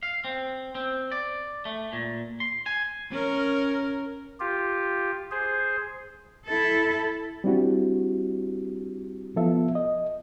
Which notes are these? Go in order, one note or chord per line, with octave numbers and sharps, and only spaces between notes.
F5
C4
C4
D5
A3
A#2
C6
G#5
C#4 A#4
F4 G4
G#4 C5
E4 A4
G3 C4 D4 E4 F#4 G4
F3 B3 F4 A4 E5
D#5